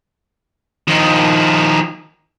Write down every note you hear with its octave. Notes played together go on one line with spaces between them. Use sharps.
D#3 F3